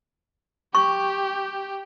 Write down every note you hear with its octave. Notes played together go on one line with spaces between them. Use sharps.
G4 C#6